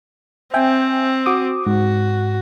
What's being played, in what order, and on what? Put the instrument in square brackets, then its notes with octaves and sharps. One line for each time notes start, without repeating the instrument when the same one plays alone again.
[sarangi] C4 [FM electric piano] E5 G5 G#5
[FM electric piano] F#4 D6 D#6
[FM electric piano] G#2 [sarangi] F#4